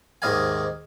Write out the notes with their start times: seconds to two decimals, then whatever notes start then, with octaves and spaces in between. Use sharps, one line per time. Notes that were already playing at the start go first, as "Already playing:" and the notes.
0.22 D#2 G#2 C3 D#5 F5 G#5